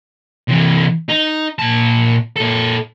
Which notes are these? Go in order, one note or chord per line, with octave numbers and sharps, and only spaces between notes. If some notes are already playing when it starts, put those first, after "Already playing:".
C3 E3
D#4
A#2 A5
A#2 A4